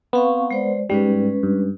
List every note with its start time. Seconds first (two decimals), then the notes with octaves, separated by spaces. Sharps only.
0.13 B3 C4 F5 C#6
0.51 G#3 C5 D5
0.89 G#2 G3 G#3 C#4 B4
1.43 G2